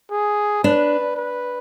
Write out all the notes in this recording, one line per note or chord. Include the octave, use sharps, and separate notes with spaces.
G#4
D4 B4
B4